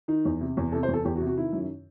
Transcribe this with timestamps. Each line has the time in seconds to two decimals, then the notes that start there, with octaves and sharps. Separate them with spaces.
0.08 D#3 D#4
0.25 E2
0.41 C3
0.57 E2
0.72 C3 A4
0.83 C5
0.88 E2
0.93 A4
1.05 E2 G4
1.16 F#4
1.21 C3
1.27 F#4
1.37 D#3 E4
1.53 F#2